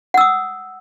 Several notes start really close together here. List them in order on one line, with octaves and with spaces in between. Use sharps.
F#5 E6 D#6